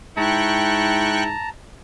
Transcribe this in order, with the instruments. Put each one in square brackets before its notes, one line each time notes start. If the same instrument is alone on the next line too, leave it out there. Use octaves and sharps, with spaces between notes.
[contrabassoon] G#2 [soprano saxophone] E4 [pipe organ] G5 C#6 F#6 [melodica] A5 A#5